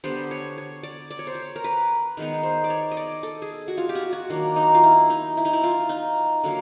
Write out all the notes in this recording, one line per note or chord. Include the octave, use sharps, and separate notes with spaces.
D3 G3 B3 D4 C5
C#5
C#5
D5
D5
C#5
C5
C#5
A#4
B4
D#3 G#3 B3 D#4
C5
D5
C#5
D#5
D5
A4
G#4
F#4
F4
G4
F#4
F#4
D#3 F#3 A#3 D4
D#4
F4
E4
D#4
E4
D#4
E4
F4
D#4
D3 F#3 A#3